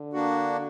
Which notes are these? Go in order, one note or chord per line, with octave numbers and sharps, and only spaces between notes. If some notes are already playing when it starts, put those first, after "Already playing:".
Already playing: D3
A#3 D4 F#4